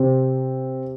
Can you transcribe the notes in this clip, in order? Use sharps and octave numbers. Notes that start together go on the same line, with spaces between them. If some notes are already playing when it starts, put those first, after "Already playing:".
Already playing: C3 C4